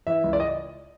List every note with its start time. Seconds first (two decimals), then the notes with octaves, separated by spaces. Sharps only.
0.07 E3 E5
0.24 C#2
0.33 D5
0.40 D#5